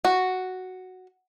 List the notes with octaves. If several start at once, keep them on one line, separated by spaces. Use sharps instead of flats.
F#4